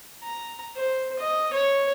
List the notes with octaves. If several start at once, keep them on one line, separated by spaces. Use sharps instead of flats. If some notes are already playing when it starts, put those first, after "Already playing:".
A#5
C5
D#5
C#5